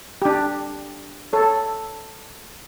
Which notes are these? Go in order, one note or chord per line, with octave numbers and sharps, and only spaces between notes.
D4 G4
A4 C#5